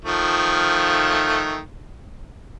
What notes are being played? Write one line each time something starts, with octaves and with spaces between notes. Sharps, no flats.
D#3 F3 A3